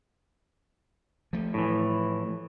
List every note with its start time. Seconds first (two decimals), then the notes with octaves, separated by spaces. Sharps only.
1.33 F3 A3
1.54 A2 E3